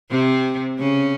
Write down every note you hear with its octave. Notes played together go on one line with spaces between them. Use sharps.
C3 C4
C#3 C#4